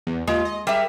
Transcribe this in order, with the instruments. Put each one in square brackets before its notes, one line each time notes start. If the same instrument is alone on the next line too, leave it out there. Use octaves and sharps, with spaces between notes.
[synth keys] E2
[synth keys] D#2 F4 [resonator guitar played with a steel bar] G#3
[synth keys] D#5
[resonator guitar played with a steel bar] G3 E5 [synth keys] G#4 A#4